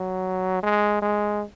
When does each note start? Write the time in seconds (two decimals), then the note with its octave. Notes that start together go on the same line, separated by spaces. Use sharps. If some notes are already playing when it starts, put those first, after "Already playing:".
Already playing: F#3
0.63 G#3
1.02 G#3